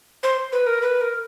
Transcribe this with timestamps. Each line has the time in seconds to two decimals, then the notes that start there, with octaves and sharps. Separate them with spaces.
0.23 C5
0.52 B4
0.67 A#4
0.82 B4
1.01 A#4